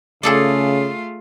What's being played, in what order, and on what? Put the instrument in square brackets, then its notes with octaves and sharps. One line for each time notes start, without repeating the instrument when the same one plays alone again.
[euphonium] C#3 [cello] A3 F4 [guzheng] G#4 A4 D5